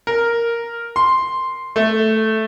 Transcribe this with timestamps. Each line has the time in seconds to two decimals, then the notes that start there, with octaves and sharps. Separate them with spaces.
0.07 A#4
0.96 C6
1.76 A3